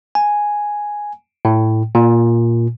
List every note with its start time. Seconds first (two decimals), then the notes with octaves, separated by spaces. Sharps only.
0.15 G#5
1.45 A2
1.95 A#2